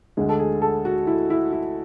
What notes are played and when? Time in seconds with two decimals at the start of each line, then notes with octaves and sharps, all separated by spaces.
0.17 D2 D3 G#3 G#4
0.29 A4
0.39 G#4
0.62 A4
0.85 F#4
1.07 E4
1.30 E4
1.52 E4